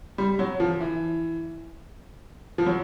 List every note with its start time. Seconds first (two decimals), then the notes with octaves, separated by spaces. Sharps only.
0.18 G3
0.39 F#3
0.60 F3
0.80 E3
2.58 F3
2.66 F#3